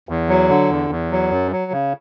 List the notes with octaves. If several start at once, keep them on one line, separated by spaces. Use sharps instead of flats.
E2
F#3
D3
E2
E2
F#3
F#2
F#3
C#3